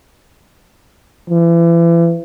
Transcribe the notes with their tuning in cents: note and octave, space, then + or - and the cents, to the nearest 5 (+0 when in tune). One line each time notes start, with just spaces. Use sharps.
E3 +35